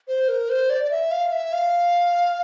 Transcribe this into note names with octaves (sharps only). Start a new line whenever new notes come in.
C5
A#4
C5
D5
D5
E5
F5
E5
F5